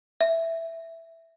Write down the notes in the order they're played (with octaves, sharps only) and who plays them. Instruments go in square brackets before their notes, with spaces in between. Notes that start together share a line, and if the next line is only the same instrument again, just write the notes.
[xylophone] E5